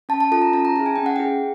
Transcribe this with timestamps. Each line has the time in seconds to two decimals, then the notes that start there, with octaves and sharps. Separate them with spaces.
0.09 C#4 A5
0.20 A5
0.32 F4 A4 A5
0.42 A#5
0.53 C#4 A5
0.65 A#5
0.76 E4 G#4 A5
0.86 G#5
0.96 C#4 G5
1.06 F#5
1.16 E4 G#4 G5